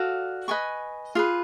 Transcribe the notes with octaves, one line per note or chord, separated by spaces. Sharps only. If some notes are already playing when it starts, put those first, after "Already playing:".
Already playing: F#4 A4 D5 F5
B4 D#5 G#5 C#6
F4 G#4 B4